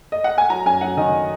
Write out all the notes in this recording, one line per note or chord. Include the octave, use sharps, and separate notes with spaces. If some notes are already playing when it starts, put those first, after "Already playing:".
D#5
F#5
G#5
F#3 A#5
F#2 G#5
F#3 F#5
D#3 D#5